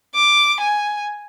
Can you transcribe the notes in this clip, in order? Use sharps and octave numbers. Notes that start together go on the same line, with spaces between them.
D6
G#5